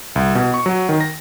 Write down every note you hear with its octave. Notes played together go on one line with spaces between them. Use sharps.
C2
B2
C#6
F#3
D#3
A#6